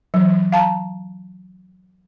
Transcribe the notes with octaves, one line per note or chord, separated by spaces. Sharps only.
E3 F#3
F5 A5 A#5